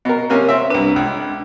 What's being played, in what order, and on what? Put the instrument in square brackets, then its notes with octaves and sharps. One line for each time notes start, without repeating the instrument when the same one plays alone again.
[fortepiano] B2 A#4
C3 A#3 C#4
C4 E5
[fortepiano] C2 B4 [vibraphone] D4
[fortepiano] C#2